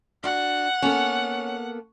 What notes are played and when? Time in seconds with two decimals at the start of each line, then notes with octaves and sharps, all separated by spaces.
0.24 D4 F#4 F#5
0.82 A#3 B3 C#4 A4